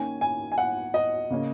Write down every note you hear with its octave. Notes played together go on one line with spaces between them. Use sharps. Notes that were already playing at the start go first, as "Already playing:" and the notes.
Already playing: D#3 A#3 C#4 G#5
G#5
G#5
F#5
D#5
C#3 A#3 C#4